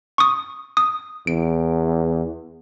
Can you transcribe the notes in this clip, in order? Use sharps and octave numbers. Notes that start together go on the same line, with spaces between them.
C#6 D#6
D#6
E2 D7